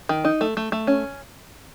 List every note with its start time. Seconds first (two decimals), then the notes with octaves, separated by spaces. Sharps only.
0.09 D#3
0.25 D#4
0.41 A3
0.57 A3
0.72 A3
0.87 C#4